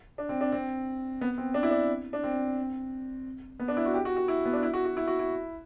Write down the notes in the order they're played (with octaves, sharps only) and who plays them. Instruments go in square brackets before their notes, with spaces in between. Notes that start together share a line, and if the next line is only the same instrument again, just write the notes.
[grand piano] D4
C4
D4
C4
B3
C4
D4
E4
D4
D4
C4
B3
D4
E4
F#4
G4
F#4
F#4
E4
B3
D4
E4
F#4
F#4
E4
F#4
E4